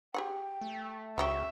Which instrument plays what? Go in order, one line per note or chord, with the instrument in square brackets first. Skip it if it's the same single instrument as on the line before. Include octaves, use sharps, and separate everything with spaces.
[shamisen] G4 G#4 F#5 [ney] G5
[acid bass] A3
[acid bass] C#2 [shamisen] C#3 F#3 G4 [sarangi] E5 [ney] C#6